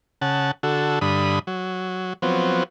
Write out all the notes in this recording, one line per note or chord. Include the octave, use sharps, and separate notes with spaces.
C#3 F#5 A5
D3 F#4 A4
G2 D3 B5 D#6
F#3
F3 F#3 B3 C4